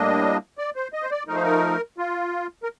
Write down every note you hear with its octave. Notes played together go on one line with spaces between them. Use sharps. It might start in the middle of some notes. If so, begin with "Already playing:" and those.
Already playing: A2 G3 A#3 D4 D#5
D5
C5
D#5
C5
D5
F3 A3 D#4 A#4
C5
A#4
F4
A#4